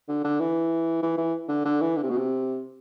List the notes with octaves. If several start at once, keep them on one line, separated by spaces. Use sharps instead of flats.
D3
D3
E3
E3
E3
D3
D3
E3
D3
C3
B2
C3